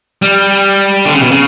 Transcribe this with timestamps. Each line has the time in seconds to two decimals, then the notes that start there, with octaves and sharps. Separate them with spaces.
0.22 G3
1.05 D3
1.14 C#3
1.22 B2
1.31 C#3